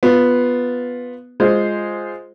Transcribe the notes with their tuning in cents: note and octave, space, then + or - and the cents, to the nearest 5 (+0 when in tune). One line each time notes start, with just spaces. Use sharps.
B3 +0 F4 +5
G#3 +0 F4 +0 C5 +0